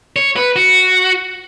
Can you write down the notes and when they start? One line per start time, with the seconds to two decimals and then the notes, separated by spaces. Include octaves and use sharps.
0.16 C#5
0.36 B4
0.56 F#4